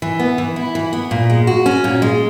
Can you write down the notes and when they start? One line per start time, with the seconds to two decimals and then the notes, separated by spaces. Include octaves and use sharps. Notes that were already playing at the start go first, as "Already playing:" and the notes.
0.02 E3
0.19 B3
0.38 E3
0.56 E4
0.75 E3
0.93 B3
1.11 A#2
1.30 G#3
1.47 F#4
1.66 C#4
1.84 A#2
2.02 G#3